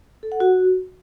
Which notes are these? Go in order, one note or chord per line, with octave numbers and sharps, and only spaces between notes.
A4
F#5
F#4